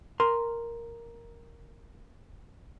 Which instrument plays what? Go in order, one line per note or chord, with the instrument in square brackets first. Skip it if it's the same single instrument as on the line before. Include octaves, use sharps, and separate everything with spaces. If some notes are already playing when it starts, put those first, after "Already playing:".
[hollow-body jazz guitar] A#4 C6